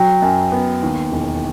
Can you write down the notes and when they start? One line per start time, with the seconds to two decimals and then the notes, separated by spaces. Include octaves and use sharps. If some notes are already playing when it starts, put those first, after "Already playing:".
Already playing: F#3 G5
0.22 F#2
0.52 B3
0.83 D#2
1.12 E1